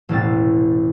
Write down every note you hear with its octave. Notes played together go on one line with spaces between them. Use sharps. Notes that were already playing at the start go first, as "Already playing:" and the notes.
E1 A1 C3 A6